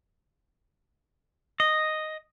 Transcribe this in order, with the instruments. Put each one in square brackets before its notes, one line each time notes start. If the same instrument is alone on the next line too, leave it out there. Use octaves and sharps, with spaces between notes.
[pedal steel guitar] D#5